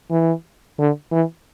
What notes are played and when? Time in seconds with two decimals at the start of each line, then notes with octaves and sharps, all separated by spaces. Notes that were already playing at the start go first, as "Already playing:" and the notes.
0.11 E3
0.79 D3
1.12 E3